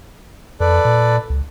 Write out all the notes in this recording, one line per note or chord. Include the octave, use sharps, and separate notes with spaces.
F2 A4 B4 D5
A#2
C#2